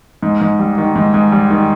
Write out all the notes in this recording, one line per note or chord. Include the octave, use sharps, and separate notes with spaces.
G#2
G#2
G3
D#3
G#2
G#2
G3
D#3